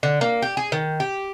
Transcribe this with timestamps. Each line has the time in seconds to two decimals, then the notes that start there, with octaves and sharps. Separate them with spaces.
0.03 D3
0.21 A#3
0.42 G4
0.57 G#4
0.72 D#3
1.00 G4